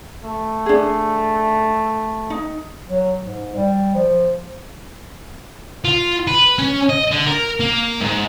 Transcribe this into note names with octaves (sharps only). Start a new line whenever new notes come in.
A3
D4 G#4
D#4
F#3
G#2
G3
F3
F4
B4
C#4
D#5
D3
A#4
A#3
G#2